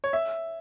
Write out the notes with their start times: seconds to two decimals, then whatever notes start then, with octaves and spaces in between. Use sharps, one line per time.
0.04 C#5
0.13 E5